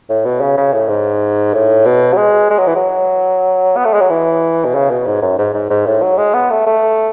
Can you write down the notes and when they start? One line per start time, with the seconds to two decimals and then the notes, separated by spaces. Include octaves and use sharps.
0.09 A2
0.25 B2
0.41 C#3
0.57 C#3
0.73 A2
0.89 G#2
1.54 A2
1.85 B2
2.13 F#3
2.17 G#3
2.50 G#3
2.59 F#3
2.67 E3
2.76 F#3
3.77 B3
3.85 A3
3.93 G#3
4.01 F#3
4.10 E3
4.65 B2
4.75 C#3
4.90 B2
5.06 G#2
5.22 F#2
5.38 G#2
5.54 G#2
5.70 G#2
5.86 A2
6.02 F#3
6.18 G#3
6.34 B3
6.50 A3
6.66 A3